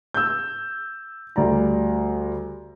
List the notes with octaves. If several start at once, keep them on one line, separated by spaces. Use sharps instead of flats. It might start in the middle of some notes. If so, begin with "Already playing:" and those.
E6 G6
D2 G3 D5 A#5